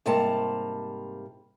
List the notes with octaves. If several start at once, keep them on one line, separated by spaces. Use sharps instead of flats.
G#2 C3 G3 A#3 A5